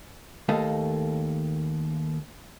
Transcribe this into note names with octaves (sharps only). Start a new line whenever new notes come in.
D#2 A3 A#3 A4 D#5 F5